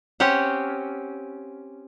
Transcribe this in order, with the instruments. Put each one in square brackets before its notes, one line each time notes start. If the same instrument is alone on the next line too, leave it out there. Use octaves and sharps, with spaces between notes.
[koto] C4 C#4 G4 F#5